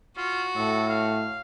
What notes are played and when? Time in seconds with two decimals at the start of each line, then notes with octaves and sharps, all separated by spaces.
0.17 F4 F#4
0.56 A2 A4
0.89 F5